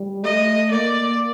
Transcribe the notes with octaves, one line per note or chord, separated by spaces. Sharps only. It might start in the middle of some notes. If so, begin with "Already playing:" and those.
Already playing: G3
A3 D#5
A#3 D5